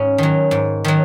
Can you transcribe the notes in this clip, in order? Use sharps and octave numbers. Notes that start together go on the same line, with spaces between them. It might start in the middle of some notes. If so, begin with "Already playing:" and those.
Already playing: G#2 C#4
D#3 F#3
G#2
D#3 F#3